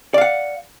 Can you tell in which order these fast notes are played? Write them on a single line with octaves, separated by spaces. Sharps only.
D5 F5 F#5